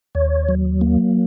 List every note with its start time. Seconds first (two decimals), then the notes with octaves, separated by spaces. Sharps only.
0.15 D#2 C#5
0.49 F#3
0.81 A#3